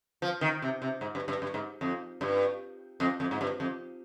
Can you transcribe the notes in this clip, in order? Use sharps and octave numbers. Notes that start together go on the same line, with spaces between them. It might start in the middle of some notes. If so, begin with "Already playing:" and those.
F3
D#3
C3
C3
G#2
G2
G2
G2
G#2
F2
G2
F2
F2
G#2
G2
F2